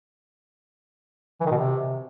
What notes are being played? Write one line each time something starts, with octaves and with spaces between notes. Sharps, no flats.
E3
D#3
B2
C3